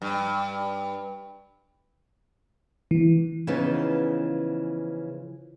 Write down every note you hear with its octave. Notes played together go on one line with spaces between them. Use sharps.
G2
E3
C#3 E3 F3 B3 D#4